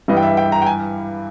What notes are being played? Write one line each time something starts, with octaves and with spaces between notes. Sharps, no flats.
G2 E3 G3 D#5
G5
E5
G5
A#5
G5
G#5